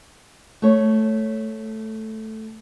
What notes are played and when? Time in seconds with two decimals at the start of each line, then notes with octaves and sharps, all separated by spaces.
0.62 A3 C#5